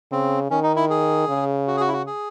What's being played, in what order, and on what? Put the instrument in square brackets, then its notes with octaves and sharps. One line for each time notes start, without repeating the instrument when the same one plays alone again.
[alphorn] C#3 [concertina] C4
[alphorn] D#3 [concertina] C#4
[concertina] D#4
E4
G#4
[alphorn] C#3
[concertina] F#4
G#4
F#4
E4
F#4
G#4